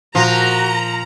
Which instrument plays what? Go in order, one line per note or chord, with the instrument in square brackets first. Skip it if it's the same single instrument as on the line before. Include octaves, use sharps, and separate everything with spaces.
[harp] A#2 [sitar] F3 [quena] F#4 [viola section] A#5